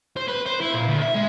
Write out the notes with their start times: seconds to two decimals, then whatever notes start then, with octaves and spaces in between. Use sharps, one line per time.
0.16 C5
0.28 B4
0.46 C5
0.61 E4
0.74 A#2
0.88 D2
1.02 E5
1.15 G#3